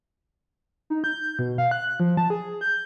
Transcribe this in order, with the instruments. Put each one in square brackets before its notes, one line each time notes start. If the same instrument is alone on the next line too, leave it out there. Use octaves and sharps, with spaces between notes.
[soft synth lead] D#4
G6
B2
F5
F#6
F3
A5
G#4
G6